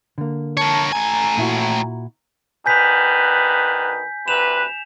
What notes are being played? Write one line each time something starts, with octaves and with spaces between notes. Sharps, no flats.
D3 A#3
A#4 C#5 A5
A2 G#5 A#5
A#2 E4 F#4
D2 D#3 B4 G#5 G6 B6
D2 C3 B4 E7 F7